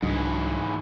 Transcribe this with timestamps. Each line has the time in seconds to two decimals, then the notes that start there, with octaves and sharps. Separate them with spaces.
0.03 C2 G#2 E3 F#3 D4